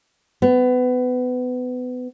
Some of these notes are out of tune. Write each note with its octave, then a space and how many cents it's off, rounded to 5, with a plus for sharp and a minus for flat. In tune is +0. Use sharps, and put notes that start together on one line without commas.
B3 +25